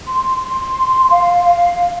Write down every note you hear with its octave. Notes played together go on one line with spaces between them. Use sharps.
C6
C6
F5
F5